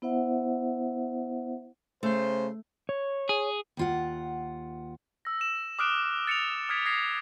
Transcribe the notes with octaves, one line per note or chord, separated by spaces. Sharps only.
B3 E4 C5 E5 F#5
C#3 A3 C5
C#5
G#4
D#2 F4 F#5
E6 A#6
E7
D6 D#6 F6 F#6 D7
A6 C#7 D7 F7
D#6 F6 G#6 B6 D7
D#6 G#6 A#6 C7